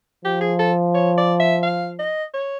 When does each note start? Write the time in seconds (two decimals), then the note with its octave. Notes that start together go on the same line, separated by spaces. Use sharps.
0.25 F3 G4
0.41 G#4
0.59 A4
0.95 C#5
1.18 D5
1.40 E5
1.63 F5
1.99 D#5
2.34 C#5